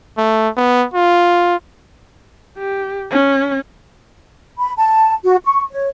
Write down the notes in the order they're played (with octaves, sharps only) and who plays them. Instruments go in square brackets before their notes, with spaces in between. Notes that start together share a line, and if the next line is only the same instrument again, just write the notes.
[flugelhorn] A3
B3
F4
[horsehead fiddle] G4
C#4
[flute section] B5
A5
F#4
C#6
C#5